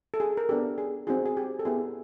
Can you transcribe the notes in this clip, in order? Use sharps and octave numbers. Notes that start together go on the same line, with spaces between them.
A4
G#4
A#4
B3 D4 G4 A4
G#4
C4 D#4 F#4 G#4
G#4
G4
A4
B3 E4 G4 G#4